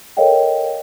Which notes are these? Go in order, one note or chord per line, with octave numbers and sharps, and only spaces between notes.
A4 A#4 C#5 D#5 F5 G5